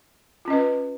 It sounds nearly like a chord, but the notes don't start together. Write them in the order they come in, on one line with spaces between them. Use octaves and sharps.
F4 C#4 D#5 B4